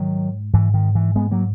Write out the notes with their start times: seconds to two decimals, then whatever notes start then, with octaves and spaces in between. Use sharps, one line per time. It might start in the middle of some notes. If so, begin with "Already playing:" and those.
Already playing: G#2 D#3 F#3
0.53 G#2 E3
0.74 D#3
0.95 E3
1.16 G#3 B3
1.31 F#3 A#3